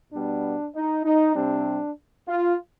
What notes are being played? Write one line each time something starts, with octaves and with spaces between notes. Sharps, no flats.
B2 G3 B3 D4
D#4
D#4
C3 G3 C4 D4
F4